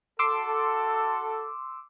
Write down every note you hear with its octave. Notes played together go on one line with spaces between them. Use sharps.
F#4 A4 C6 D6 E6